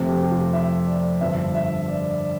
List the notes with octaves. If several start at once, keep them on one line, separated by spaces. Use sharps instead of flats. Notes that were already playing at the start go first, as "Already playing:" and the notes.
Already playing: F2 C3 F3 A3
G4
G4
F4
E5
D5
G1 G2 F3 E5
E5
D5
D5